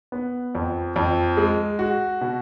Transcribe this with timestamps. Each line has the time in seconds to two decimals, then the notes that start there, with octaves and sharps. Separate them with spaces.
0.12 B3
0.55 F2
0.96 F2
1.37 G#3
1.79 F#4
2.21 B2